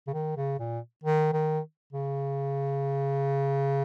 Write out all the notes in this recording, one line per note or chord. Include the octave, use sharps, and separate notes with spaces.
C#3
D#3
C#3
A#2
D#3
D#3
C#3